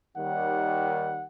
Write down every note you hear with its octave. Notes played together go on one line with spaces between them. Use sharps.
D#2 D#3 G3 F#5